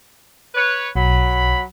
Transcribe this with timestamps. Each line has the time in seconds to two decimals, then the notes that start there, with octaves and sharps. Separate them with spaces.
0.54 B4 C#5
0.95 B1 F#3 B5